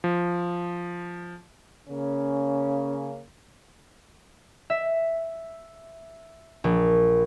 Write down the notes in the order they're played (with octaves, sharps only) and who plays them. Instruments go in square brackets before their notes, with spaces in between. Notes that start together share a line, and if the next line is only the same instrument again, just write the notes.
[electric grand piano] F3
[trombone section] C#3 A#3 C#4
[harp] E5
A#1